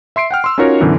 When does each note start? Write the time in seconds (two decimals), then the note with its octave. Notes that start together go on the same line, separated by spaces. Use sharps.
0.16 E5 C6 C7 D7
0.31 F#5 G5 F6
0.44 C6 E6
0.58 C#4 D#4 F4 F#4 A#4 C#5
0.81 F#2 B2 D3 E3